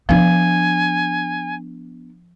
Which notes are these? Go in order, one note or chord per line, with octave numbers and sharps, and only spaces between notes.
F3 B3 D4 G#5